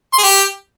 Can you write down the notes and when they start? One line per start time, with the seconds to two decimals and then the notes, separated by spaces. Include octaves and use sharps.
0.13 C6
0.18 G#4
0.23 G4